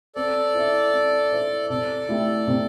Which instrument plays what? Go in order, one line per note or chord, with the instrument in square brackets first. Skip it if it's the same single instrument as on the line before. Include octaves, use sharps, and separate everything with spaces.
[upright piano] C4 [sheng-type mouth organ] A4 D5
[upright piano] E4 C5 E5
C4
E4 C5 E5
[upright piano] C3 [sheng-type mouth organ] A4 D5
[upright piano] A3 E4 G4
C3